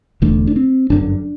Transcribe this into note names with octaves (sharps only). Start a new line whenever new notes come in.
E1 E2 D3 A3
D4
C4
G1 F#2 D3 D4